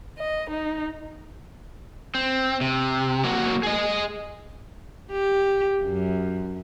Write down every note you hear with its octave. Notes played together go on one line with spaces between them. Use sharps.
D#5
D#4
C4
C3
F#3 A#3 F#4
G#4 D#5
G4
F#2